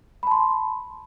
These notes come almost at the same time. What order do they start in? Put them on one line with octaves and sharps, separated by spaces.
B5 A5 C6